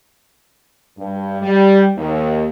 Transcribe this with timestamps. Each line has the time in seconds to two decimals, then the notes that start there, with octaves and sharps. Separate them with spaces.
0.98 G2
1.42 G3
1.96 D#2